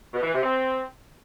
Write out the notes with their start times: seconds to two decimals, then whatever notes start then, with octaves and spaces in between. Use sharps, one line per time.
0.13 B2
0.23 E3
0.33 C3
0.43 C4